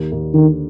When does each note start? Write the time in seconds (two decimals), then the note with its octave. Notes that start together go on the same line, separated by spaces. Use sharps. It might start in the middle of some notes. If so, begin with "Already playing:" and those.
Already playing: D#2
0.12 D#2
0.34 D3 D#3